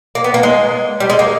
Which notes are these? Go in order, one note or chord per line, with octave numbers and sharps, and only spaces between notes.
A#3
B3
A#3
G#3
G3
G#3
A#3